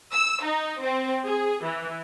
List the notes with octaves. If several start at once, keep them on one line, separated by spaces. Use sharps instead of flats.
E6
D#4
C4
G#4
E3